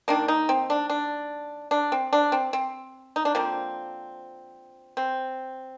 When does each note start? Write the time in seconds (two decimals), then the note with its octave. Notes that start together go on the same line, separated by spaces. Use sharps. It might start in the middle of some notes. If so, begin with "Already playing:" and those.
0.08 D#3 A#3 D4
0.28 D#4
0.49 C4
0.70 D4
0.90 D4
1.71 D4
1.92 C4
2.13 D4
2.32 C4
2.53 C4
3.16 D#4
3.25 D4
3.35 D3 F3 A#3 C4
4.97 C4